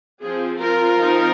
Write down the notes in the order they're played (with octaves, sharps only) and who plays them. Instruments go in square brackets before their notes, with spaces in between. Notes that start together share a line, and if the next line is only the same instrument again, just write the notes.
[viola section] F3 C4 F4 G#4
F4 A#4
F3 C4 D#4